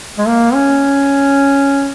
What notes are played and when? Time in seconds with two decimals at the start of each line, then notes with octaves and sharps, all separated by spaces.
0.18 G#3
0.27 A#3
0.55 C#4